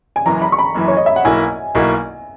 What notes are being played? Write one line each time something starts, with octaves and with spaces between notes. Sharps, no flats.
G#5
F#1 F#2 E3 A#5
B5
C#6
B5
F#1 F#2 E3
C#5
D#5
E5
F#5
B1 B2 A#3 E4 G#5
B1 B2 A#3 E4